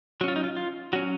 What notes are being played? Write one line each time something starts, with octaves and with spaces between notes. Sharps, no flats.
F#3 C#4 F4 F#4
D#4
F4
F4
F#3 C#4 F#4